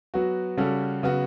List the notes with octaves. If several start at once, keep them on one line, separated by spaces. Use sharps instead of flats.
F#3 B3 F#4
C#3 G3 C#4 F#4 A4
C#3 F#3 B3 F#4